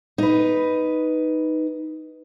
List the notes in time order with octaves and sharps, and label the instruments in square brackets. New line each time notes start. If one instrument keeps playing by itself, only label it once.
[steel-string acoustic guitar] D#4 B4